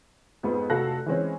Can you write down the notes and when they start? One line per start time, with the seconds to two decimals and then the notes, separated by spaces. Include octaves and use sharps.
0.43 F2 G#2 B3
0.70 F1 F#4 A4 F5 F#6 A#6
1.06 E3 G#3 C4 C#4